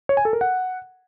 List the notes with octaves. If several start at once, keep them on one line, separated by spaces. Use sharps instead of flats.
C#5
G#5
A4
A#4
F#5